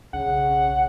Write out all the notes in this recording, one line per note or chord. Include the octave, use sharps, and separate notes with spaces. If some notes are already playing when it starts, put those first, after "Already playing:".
B1 C#3 F#5